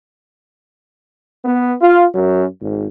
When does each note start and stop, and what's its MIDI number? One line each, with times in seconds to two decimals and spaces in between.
1.45 1.73 59
1.81 2.02 65
2.13 2.45 42
2.60 2.87 32